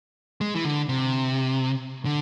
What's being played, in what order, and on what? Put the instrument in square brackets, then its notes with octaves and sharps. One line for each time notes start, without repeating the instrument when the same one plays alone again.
[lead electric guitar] G#3
E3
D3
C3
D3